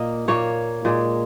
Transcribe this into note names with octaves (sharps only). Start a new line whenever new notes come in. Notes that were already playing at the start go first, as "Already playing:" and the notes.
Already playing: A#2 A#3 D#5
A#2 A#3 C#5
A#2 G#3